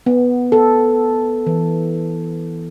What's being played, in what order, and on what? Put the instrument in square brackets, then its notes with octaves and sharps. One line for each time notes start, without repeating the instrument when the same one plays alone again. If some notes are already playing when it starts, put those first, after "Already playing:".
[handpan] B3
A4
E3